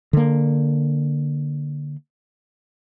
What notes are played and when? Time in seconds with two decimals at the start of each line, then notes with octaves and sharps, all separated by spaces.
0.13 D3 A#3